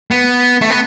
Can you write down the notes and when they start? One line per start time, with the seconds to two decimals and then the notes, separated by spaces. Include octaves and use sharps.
0.11 B3
0.61 A3
0.70 B3